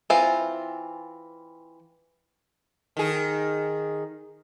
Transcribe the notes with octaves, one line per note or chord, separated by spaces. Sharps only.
E3 C4 F4
D#3 G#4